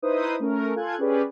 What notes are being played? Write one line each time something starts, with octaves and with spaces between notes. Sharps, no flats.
D#4 E4 B4 C5 D#6
A3 C#4 A#4
F4 A4 G#5 F#6 G#6
C#4 G4 G#4 B4 D5